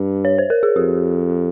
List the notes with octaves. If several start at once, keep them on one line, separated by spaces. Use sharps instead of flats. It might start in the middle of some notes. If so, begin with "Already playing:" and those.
Already playing: G2
C#5
C5
A#4
G#4
F2 G4